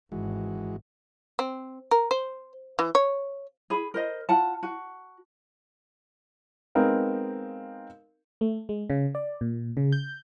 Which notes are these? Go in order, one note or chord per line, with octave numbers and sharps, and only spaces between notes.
G#1 E3 G#3 F#4
C4
A#4
C5
E3
C#5
G#4 B5
A#4 C5 D#5
F4 F#5 A5
F#4
G#3 B3 C4 D#4 A#4 F5
A3
G#3
C#3
D5
A#2
C#3
G6